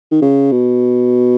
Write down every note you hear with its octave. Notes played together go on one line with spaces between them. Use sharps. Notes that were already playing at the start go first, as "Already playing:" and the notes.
D#3
C#3
B2